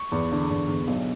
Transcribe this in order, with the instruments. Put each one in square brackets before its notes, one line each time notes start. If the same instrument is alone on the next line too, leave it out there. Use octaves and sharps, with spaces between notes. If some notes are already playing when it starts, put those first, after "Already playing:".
Already playing: [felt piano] C#6
E2
D3
E2
E2
B1